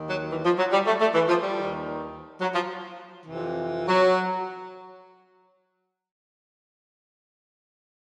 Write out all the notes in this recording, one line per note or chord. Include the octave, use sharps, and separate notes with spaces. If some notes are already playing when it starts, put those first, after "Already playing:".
Already playing: D#2 D#3
F#3
E3
F3
F#3
G3
A3
A3
E3
F3
G3
D#2 D#3
F#3
F3
F2 C3 E3
F#3